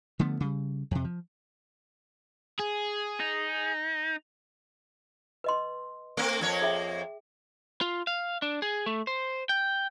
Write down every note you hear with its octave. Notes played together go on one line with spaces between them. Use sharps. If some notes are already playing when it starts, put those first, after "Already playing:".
D3 F3 A3 B3
C#3 G3
F2 C3
F3
G#4
D#4
B4 D#5 C6
A3 A#3 C4
F2 A#3 C#5
G#4 E5 G5
F4
F5
D4
G#4
A3
C5
G5